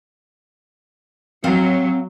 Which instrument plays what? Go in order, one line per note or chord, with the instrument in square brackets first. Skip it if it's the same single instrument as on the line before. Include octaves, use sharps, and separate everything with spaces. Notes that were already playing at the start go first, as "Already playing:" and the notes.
[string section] F#3 [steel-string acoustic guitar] C4 F5